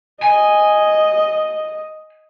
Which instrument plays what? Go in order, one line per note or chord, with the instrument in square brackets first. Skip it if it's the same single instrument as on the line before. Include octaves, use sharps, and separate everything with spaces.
[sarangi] D#5 [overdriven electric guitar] G#5